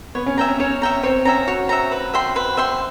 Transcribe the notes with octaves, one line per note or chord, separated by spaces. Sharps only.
B3 C#5
C#4
C#4 E5 G5 A#5
C#4
C#4 C#5
E5 G5 A#5
C4 C#5
C#4 E5 G5 A#5
F#4 C#5
E5 G5 A#5
B4
E5 G5 C6
B4
E5 G5 C6